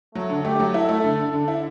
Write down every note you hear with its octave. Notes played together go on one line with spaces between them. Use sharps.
F#3 A3
D3
A3 G4
F#3
E4 A4
A3
D3
D3
D3
E4